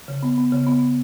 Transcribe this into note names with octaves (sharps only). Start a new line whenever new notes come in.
C#3
B3
B3
C#3
B3